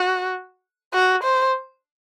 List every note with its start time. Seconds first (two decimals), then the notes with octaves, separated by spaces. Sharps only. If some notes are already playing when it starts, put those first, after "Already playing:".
Already playing: F#4
0.93 F#4
1.24 C5